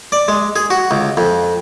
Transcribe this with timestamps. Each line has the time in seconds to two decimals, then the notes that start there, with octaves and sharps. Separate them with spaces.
0.12 D5
0.28 G#3
0.56 G#4
0.70 F#4
0.91 C#2
1.17 F2